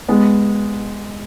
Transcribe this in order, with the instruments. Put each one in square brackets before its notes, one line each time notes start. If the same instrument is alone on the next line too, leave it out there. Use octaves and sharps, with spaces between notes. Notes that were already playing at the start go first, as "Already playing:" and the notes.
[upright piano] G#3 B3